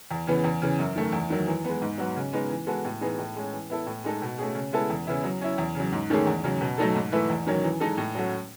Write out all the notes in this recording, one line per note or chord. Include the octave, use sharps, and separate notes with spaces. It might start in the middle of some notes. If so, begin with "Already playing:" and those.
E2
C#3 E3 B3
E2
C#3 E3
F#2
D#3 A3
E2
D#3 F#3
E3
G#3 B3
G#2
F#3 B3 F#4
C#3
G#3 B3 D#4
E3
G#3 B3 F#4 A4
A2
E3 B3 D#4 G#4
A2
G#3 C#4
E3
B3 E4 A4
A2
G#3 D#4 A4
B2
A3 C#4 G#4
C#3
G#3 B3 E4 A4
E2
C#3 E3 B3 E4
F#3
C#4 E4
E2
C#3 F#3
G#2
D#3 A3 C#4 G#4
E2
C#3 F#3
B2
F#3 A3 D#4 A4
G#2
E3 A3 E4 B4
E2
D#3 F#3 C#4
E3
G#3 D#4 A4
A2
F#3 A3 C#4 F#4